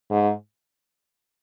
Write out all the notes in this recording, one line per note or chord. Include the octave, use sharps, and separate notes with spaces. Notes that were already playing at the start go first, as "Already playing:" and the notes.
G#2